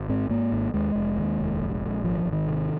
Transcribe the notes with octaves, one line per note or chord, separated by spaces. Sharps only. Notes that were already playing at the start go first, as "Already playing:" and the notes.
Already playing: G#1
G#2 C4
G#2 A#3
G#1
D#2 G#3
F1
D#2
F1
A#1
A#1
G#1 F3
F3
G#1
D#3
C3